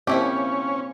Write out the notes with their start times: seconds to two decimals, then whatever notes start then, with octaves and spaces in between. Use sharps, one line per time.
0.07 F3 A#3 C4 C#4 E4 G4